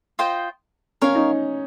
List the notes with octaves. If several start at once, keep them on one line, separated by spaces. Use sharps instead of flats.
F4 C5 D#5 G5
C#4 A#4 C#5 F5
D#4